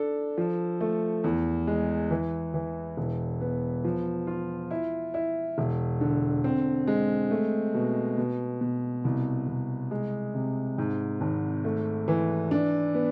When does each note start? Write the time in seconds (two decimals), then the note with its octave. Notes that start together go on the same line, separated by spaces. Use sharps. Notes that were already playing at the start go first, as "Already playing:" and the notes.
Already playing: D4 A4
0.38 F3
0.80 A3
1.24 E2
1.67 G#3
2.10 E3
2.54 E3
2.97 E1
3.41 B3
3.84 F3
4.27 F4
4.71 E4
5.14 E4
5.58 E1
6.01 D3
6.44 C4
6.87 G#3
7.31 A3
7.74 B2
8.18 B2
8.61 B2
9.04 C2
9.48 C2
9.91 G#3
10.34 C3
10.78 G#2
11.21 G#1
11.64 A3
12.08 E3
12.51 D4
12.94 B3